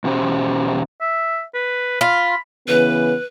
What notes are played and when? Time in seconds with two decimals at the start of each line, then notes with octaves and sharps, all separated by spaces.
0.04 E2 B2 C#4 G4 C5
1.01 E5
1.54 B4
2.01 F4 B5
2.68 C#3 E3 B3 B4